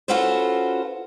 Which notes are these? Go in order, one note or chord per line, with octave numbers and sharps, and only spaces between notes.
C#4 F4 F#4 A4 B4 C5